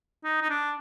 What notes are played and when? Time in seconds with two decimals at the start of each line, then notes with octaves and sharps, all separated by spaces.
0.24 D#4
0.42 D#4
0.49 D4